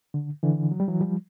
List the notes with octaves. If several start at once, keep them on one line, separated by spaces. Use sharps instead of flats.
D3
D3 E3
F#3
G3
E3 F#3
F3 G3